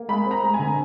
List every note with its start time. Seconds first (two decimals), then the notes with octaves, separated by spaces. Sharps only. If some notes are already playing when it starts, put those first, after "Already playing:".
Already playing: A#3
0.08 G#3 B5
0.26 C4
0.31 A#5
0.43 G#3
0.54 G#5
0.59 D3